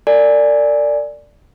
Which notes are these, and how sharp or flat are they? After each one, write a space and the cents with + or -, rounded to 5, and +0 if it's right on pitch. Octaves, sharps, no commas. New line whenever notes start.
A#4 -40 D5 +0 G#5 +0